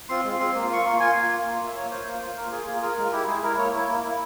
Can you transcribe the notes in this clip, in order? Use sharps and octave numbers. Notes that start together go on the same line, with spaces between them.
C4 F4 C6
G#3
C4 F4
A#3
F4 C#6
A#3 C6
F4 G#5
A#3
F4
A#3
F4
E5
A#3 C#5
F4 C5
A#3
F4
A#3 A#4
F4 G#4
A#3 G#4
F4 A#4
G#3 A#4
E4 G4
G#3 G#4
E4 A#4
A#3 C#5
E4
A#3
E4